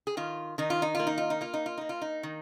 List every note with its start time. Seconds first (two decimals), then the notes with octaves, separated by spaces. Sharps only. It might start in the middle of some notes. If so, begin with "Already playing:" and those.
0.07 G#4
0.17 D#3 F4
0.58 D#3 D#4
0.70 F4
0.82 D#4
0.95 A#3 F4
1.07 D#4
1.18 F4
1.30 D#4
1.41 A#3 F4
1.54 D#4
1.66 F4
1.78 A#3 D#4
1.89 F4
2.02 D#4
2.23 D#3